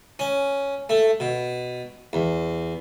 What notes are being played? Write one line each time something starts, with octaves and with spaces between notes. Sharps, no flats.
C#4
A3
B2
E2